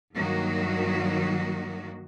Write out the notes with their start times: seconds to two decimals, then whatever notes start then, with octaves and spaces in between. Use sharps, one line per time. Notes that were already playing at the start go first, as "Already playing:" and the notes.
0.15 G2 D#3 F#3 A#3 F#4